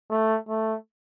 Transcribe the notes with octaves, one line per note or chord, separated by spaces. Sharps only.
A3
A3